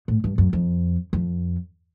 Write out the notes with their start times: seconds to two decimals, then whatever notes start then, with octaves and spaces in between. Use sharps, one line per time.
0.08 A2
0.24 G2
0.38 F#2
0.53 F2
1.13 F2